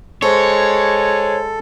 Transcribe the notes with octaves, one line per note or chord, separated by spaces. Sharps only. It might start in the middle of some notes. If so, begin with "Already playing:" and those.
G#3 A4 C5 C#5